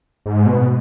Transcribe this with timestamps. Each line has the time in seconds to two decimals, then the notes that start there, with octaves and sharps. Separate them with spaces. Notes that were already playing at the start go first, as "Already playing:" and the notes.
0.26 G#2
0.47 B2